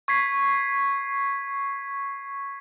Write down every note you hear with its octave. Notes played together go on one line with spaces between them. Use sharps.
C#6 G#6 B6 C7